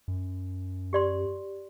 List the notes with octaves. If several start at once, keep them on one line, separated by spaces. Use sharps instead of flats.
F#2
G4 D5 C6